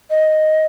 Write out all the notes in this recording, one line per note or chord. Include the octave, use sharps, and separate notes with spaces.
D#5